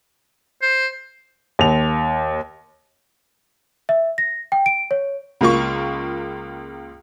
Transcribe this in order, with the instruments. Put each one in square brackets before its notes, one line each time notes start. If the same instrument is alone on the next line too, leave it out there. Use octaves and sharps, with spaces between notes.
[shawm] C5
[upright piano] D#2 F7
[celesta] E5
A#6
G5
D7
C#5
[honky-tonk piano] C#2 A#3 F4 C#6